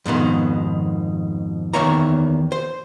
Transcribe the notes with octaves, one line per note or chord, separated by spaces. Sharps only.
F2 G#2 B2 D#3
E2 D#3 A#3 C#5 E5 A#5
C5